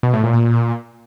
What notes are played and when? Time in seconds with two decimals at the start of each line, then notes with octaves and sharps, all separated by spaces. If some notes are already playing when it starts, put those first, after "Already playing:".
0.03 B2
0.13 A2
0.23 A#2
0.33 A#2